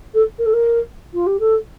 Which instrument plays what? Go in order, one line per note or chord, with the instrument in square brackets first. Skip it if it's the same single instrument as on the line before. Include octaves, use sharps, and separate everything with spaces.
[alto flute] A4
A#4
A4
A#4
F4
G4
A4